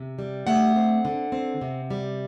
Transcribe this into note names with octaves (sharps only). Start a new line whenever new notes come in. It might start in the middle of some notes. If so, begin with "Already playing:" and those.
Already playing: C3
G3
A3 F#5
C4
D3
C4
C3
G3